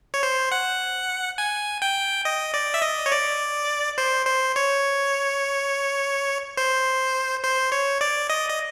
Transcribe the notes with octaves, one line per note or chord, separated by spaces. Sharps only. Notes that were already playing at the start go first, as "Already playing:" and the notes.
C#5
C5
F#5
G#5
G5
D#5
D5
E5
D#5
C#5
D5
C5
C5
C#5
C5
C5
C#5
D5
D#5
D#5